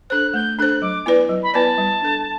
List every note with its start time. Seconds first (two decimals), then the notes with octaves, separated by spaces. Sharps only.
0.10 D4 A4 C5 F#6
0.34 A3 G6
0.58 D4 A4 C5 F#6
0.82 F#3 D6
1.06 B3 E4 B4 D5
1.29 F#3
1.43 B5
1.54 B3 E4 B4 D5 A5
1.78 G3
2.02 D4 A4